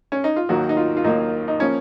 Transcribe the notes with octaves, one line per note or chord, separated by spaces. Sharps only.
C#4
D#4
F4
D#2 D#3 F#3 A#3 F#4
D#4
F4
F4
D#2 D#3 F#3 A#3 D#4
D#4
F3 A#3 C#4